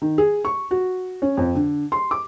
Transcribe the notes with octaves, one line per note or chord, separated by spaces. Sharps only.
D#3
G#4
C#6
F#4
C#4
F2
D3
C6
D6